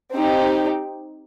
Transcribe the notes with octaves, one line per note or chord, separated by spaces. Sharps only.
C4 D#4 G4